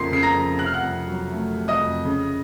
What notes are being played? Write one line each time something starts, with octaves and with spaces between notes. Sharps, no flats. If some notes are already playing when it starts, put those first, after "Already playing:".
Already playing: F2 C#3 F3 A#3 C6 C7
C#3 C7
A#5 A#6
F2
C3 F#6
F6
F#5 F#6
F2
F#3
A3
C3
D#5 D#6
F2
C#3